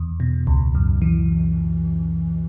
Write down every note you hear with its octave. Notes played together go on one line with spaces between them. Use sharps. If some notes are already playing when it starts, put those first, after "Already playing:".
Already playing: E2
B2
C#2
F#2
E3